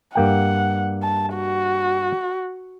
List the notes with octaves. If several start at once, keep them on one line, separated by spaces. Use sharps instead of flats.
G2 A#3 F#5 G5
A5
F#4